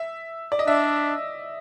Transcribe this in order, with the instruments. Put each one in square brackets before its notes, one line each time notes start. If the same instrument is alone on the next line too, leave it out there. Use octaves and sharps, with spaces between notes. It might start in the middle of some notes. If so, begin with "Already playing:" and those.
Already playing: [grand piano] E5
D5
D#5
[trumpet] D4 [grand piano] E5